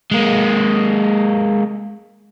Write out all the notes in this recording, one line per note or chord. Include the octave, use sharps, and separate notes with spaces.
G#3 A#3